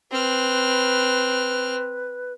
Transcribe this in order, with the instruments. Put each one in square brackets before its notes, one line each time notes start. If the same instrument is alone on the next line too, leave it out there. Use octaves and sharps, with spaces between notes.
[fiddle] C4 F6 [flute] B4